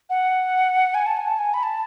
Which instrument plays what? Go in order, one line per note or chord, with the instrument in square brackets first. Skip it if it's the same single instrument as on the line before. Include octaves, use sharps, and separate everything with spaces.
[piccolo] F#5
G#5
A5
G#5
A5
G#5
B5
A5